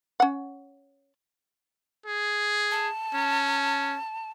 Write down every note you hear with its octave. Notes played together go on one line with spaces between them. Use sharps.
C#4 F#5
G#4
A5
C#4